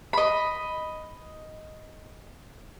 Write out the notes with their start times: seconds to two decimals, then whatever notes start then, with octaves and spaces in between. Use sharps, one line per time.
0.13 D#5 B5